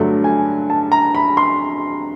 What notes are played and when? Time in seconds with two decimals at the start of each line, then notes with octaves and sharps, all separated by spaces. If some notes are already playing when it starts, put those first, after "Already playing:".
Already playing: G2 D3 F#3 A3
0.24 G#5
0.70 A5
0.92 A#5
1.15 B5
1.37 C6